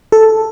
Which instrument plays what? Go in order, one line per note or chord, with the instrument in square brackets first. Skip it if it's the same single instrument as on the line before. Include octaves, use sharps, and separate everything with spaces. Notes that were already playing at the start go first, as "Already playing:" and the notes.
[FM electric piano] A4